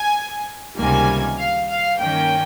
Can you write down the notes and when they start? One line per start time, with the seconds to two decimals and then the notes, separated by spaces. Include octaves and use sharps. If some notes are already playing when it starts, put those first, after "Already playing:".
Already playing: G#5
0.77 C#2 C3 D#3 G3 A#3 G#5
1.38 F5
1.69 F5
1.99 G2 D#3 A#3 C#4 G5